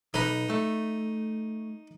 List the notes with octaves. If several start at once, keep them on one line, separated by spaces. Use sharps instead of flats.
B1 D#4 B4
A3